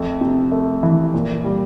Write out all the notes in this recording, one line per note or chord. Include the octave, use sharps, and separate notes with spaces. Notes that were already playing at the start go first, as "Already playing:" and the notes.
Already playing: F2 A3
C3
A3
E3
A#2
G3